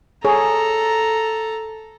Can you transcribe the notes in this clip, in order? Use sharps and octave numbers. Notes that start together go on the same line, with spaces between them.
G#4 A4 C#5 A#5